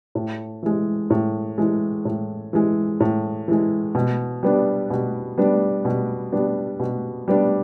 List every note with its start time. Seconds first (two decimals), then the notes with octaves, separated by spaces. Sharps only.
0.15 A2
0.63 E3 G#3
1.10 A2
1.58 E3 G#3
2.05 A2
2.53 E3 G#3
3.00 A2
3.48 E3 G#3
3.95 B2
4.43 G3 B3 D4
4.90 B2
5.38 G3 B3 D4
5.85 B2
6.32 G3 B3 D4
6.80 B2
7.28 G3 B3 D4